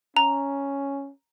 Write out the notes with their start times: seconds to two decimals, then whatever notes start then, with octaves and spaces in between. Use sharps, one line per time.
0.17 C#4 A#5